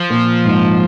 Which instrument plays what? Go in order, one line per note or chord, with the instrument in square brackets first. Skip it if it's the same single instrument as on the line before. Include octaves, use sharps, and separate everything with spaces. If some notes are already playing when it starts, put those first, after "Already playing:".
Already playing: [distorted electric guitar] F3
[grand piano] A#2
G#2